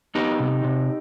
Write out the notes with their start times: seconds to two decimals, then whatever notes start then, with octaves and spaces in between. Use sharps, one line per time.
0.15 B3 D#4 G4
0.40 C3
0.64 C3